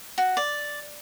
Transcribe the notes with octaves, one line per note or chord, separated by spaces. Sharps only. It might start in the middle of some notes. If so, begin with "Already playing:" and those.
F#4
D5